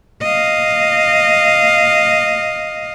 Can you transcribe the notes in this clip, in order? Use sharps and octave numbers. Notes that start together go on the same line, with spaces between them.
D#5 F5